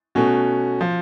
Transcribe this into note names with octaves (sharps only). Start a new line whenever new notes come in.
B2 A3 C#4 F#4
F3